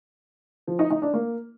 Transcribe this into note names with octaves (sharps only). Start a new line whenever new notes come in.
F3
D#4
D#4
D4
A#3